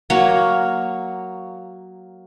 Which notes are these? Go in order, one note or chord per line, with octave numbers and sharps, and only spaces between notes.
F#3 A#3 C#5